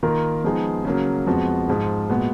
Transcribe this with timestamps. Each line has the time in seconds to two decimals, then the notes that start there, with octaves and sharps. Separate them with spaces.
0.03 D#3 A#3 F4 A#4
0.44 F3 G#3 B3 D#4 G#4
0.85 C#3 F#3 A#3
1.26 F2 F3 G#3 B3 F#4
1.68 G#2 F3 G#3
2.09 A#2 G#3 B3 F#4